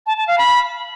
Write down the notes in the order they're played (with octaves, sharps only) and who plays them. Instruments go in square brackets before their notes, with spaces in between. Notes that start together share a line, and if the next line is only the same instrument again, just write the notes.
[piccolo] A5
A5
F5
B5